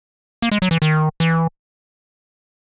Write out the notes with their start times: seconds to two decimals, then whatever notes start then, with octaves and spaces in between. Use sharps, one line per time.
0.42 A#3
0.52 G#3
0.62 F#3
0.71 E3
0.82 D#3
1.20 E3